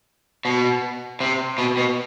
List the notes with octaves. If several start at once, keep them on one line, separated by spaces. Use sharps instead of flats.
B2
C3
B2
B2